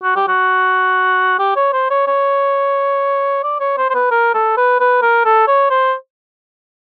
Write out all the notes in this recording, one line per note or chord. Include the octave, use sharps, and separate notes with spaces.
F#4
G4
F#4
G4
C#5
C5
C#5
C#5
D5
C#5
C5
C5
B4
A#4
A4
B4
B4
A#4
A4
C#5
C5